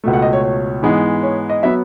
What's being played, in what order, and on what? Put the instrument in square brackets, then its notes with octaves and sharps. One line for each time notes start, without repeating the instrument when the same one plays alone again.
[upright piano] C#2 B2 A3
F#5
D#5
C#5
C#5
G#2 E3 G#3 B3
C#5
D#5
F#3 B3 E5